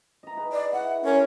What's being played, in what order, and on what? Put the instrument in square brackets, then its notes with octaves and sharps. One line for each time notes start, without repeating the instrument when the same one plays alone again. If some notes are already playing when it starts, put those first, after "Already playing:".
[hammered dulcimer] D#5 A#5
D#4 G#4 B4
[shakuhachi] D5
[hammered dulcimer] E4 [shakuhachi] F#5
[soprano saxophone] C#4 [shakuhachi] A#4